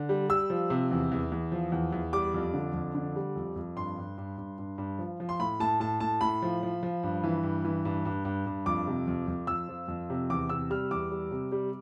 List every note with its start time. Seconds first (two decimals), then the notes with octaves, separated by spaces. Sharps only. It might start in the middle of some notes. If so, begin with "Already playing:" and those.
Already playing: D3
0.09 G3
0.29 G3 E6
0.50 F3
0.70 C3
0.91 E2
1.12 E2
1.32 E2
1.52 F3
1.72 E2
1.93 E2
2.13 G3 D6
2.34 F2
2.54 D3
2.74 F2
2.95 D3
3.16 G3
3.36 F2
3.56 F2
3.76 G2 C6
3.97 G2
4.18 G2
4.38 G2
4.58 G2
4.78 G2
4.99 F3
5.20 F3
5.29 C6
5.39 A2 B5
5.60 A2 A5
5.80 A2 A5
6.00 A2 A5
6.21 A2 B5
6.42 F3
6.63 F3
6.83 F3
7.03 G2
7.24 E3
7.43 G2
7.65 E3
7.85 G2
8.05 G2
8.25 G2
8.46 G2
8.66 F2 D6
8.87 C3
9.07 F2
9.28 F2
9.47 F2 E6
9.69 F3
9.88 F2
10.10 C3
10.30 E2 D6
10.49 C3 E6
10.70 G3 F6
10.91 E2 D6
11.11 G3
11.31 C3
11.52 G3